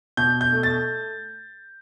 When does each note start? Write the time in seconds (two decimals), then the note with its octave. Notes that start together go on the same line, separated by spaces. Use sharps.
0.17 B2 G6
0.41 G6
0.52 A3
0.63 A6